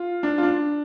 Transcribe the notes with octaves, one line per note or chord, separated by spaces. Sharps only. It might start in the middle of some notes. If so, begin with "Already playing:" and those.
Already playing: F4
D4
F4
D4